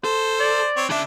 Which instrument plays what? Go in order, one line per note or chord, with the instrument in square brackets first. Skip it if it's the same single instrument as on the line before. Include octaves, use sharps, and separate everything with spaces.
[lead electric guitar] A4 [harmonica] C5
[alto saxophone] D5
[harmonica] C4 C#5
[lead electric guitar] C#3 E5 [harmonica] D4